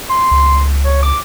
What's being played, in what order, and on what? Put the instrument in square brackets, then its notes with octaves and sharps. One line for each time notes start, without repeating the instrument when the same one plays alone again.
[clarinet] C6
[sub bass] C#2
[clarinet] C#5
D6